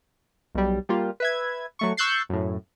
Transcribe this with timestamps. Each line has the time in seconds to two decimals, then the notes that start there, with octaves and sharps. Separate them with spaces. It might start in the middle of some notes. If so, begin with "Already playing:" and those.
0.55 B1 G3
0.89 G3 A#3 F4
1.20 B4 E5 G#6
1.79 F#3 A3 C#6
1.97 C#6 E6 F#6 G6 A6 C7
2.29 F#2 A2